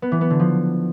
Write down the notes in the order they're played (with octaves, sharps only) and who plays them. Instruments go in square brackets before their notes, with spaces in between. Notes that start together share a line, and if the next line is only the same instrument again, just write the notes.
[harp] B3
E3
B3
D3
F3